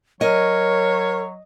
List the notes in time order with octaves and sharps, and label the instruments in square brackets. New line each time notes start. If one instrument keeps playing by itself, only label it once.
[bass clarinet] F#3 [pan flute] A#4 [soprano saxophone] C#5 [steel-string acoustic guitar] D#5